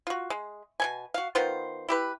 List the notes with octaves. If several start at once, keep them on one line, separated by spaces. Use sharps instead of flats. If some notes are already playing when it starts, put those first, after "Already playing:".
F4 F#4
G#3
B2 C#4 G#5
F#4 F5
D#3 B3 F4 C5
E4 G4 B4